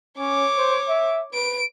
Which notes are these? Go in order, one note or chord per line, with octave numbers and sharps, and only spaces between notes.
C#4 C#5 D6
C5
E5
B4 D7